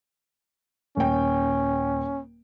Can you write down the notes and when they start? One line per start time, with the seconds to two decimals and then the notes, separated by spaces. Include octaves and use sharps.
0.97 D#1 C#4 G5